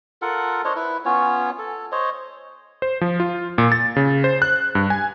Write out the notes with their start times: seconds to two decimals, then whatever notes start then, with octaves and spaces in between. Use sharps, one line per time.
0.22 F4 A4 A#4 F#5
0.65 D4 C5 C#5 D#5
0.76 E4 B4
1.05 B3 C#4 F4 C#5
1.59 A4
1.92 C5 C#5 D#5
2.82 C5
3.01 F3
3.20 F4
3.58 A#2
3.72 A6
3.96 C#3
4.24 C5
4.42 F#6
4.75 G2
4.90 G#5